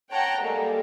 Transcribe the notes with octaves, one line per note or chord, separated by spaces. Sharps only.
C#5 F#5 G5 A5 A#5
G3 G#3 A#3 A4 A#4